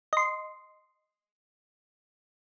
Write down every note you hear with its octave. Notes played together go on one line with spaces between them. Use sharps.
D#5 C6